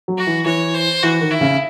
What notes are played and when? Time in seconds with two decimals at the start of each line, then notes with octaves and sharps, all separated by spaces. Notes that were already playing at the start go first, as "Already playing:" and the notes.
0.08 F#3
0.18 F#4
0.27 E3
0.46 E3 C#5
0.74 C5
1.03 E3 F#4
1.21 D#3
1.31 E4
1.41 C#3